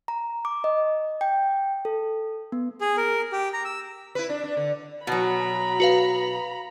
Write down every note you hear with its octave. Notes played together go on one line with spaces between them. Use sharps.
A#5
D6
D#5
G5
A4
B3
G#4
A#4
G4
A#5
E6
E4 B4
D4
D4
D3
B2 F#3 A#5 B5
F#4 B4 F5